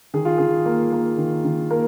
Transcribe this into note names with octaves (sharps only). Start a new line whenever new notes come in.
D#3 G#4
F4
D#3 G#4
A#3
A#3
D#3
D#3
A#3 A#4